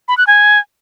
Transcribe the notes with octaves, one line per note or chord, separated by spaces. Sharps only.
B5
F#6
G#5